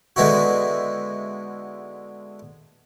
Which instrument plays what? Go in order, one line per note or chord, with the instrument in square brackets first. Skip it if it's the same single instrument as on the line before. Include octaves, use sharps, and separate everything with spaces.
[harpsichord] D3 G#3 B3 D#4 E4 F#4